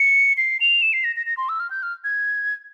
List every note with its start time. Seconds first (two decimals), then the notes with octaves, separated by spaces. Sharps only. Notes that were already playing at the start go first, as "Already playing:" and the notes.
Already playing: C#7
0.37 C7
0.61 F7
0.82 E7
0.93 C7
1.04 A#6
1.16 A#6
1.26 A#6
1.37 C6
1.49 E6
1.60 F6
1.70 G6
1.83 F6
2.04 G#6